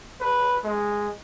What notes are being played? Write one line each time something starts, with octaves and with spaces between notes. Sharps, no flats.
B4
G#3